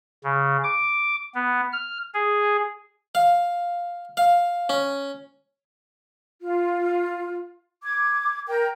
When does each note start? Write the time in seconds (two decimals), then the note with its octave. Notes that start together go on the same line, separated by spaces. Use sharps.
0.24 C#3
0.64 D6
1.35 B3
1.73 F6
2.14 G#4
3.15 F5
4.17 F5
4.69 C#4
6.42 F4
7.84 D6 G#6
8.48 A#4 G5 G6